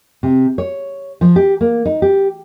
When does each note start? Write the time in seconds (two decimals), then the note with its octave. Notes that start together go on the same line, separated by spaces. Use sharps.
0.23 C3
0.58 C#5
1.21 F3
1.36 G4
1.61 A#3
1.85 D#4
2.02 G4